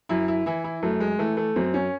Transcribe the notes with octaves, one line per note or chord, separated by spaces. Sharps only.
F#2 E4
E4
E3 E4
E4
F#2 A3
G#3
E3 A3
A3
F#2 C4
C#4